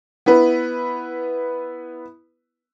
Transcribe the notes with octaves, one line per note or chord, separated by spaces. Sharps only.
B3 E4 B4